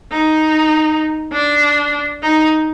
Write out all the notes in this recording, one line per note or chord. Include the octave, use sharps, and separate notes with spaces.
D#4
D4
D#4